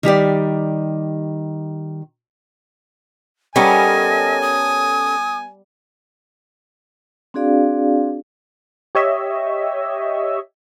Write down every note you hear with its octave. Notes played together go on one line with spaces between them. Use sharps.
D#3 G3 G4 D5
G3 B3 C#4 A4 A#4 D#5 G#5
D#6
C4 D4 F#4 G#4 D5 F5
G4 C#5 D#5 E5